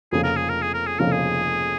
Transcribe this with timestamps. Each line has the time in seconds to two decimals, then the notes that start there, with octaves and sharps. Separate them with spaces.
0.12 F1 F2 C#3 F3 A#3 G#4
0.24 A#4
0.36 G#4
0.49 A#4
0.62 G#4
0.74 A#4
0.86 G#4
0.99 F1 F2 C#3 F3 A#3 A#4
1.12 G#4